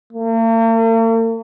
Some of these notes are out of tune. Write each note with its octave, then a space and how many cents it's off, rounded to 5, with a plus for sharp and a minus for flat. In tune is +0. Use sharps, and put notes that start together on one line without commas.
A#3 -45